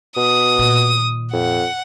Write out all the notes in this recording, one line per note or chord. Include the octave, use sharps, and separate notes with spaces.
B2 D#6
A#2 D#3
F2 F#5